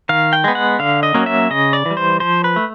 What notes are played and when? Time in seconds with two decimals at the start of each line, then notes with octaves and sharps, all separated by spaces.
0.09 D#3 F5
0.33 G5
0.44 G#3 B3
0.55 F#5
0.79 D3 F5
1.03 D#5
1.14 F#3 A#3 C#4
1.26 E5
1.50 C#3 D#5
1.73 D5
1.86 E3
1.91 G3
1.97 C5
2.20 F3 C5
2.44 B4
2.56 A3